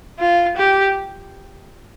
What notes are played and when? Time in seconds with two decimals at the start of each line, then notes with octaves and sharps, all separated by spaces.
0.19 F4
0.57 G4